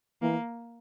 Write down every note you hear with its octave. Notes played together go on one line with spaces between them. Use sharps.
E3 A#3